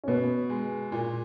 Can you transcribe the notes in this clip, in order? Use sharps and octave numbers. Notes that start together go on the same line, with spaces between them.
C#4
B2 B3
G#3
A#2